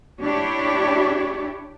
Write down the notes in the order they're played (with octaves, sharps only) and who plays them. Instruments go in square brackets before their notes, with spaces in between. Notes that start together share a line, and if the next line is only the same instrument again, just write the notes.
[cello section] D4 E4 G4 C#5